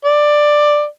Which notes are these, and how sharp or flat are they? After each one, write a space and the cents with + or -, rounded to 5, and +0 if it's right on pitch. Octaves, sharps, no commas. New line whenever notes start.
D5 +10